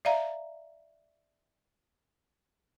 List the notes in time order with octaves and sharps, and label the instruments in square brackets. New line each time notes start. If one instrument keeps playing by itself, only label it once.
[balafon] D5 E5 F5 A#5